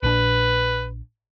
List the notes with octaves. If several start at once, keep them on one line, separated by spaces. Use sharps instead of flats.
A#1 A#2 D4 B4